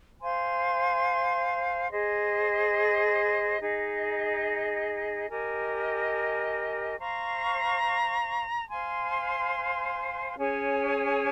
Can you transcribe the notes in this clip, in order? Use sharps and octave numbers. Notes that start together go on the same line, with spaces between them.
C5 F5 G#5 C6
G#4 C5 D#5
D#4 G#4 D#5
G4 A#4 D#5 G#5
C5 F5 A#5 C#6
C5 F5 G#5 C6
C#4 G#4 C#5 G#5